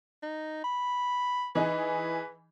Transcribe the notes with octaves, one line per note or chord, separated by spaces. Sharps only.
D#4
B5
E3 D#4 G#4 B4